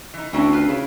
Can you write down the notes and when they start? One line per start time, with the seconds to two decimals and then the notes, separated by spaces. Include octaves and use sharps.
0.14 E3 D#4
0.33 D2 C4 C#4 E4
0.52 C4 F4 B4
0.68 C#3 E4